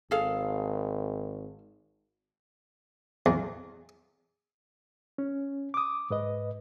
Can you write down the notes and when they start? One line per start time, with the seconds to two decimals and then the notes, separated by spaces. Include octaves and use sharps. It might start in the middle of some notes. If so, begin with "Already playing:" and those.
0.11 G#1 G#4 A4 F5
3.26 E2
5.18 C#4
5.74 D6 D#6
6.10 G#2 B4 D#5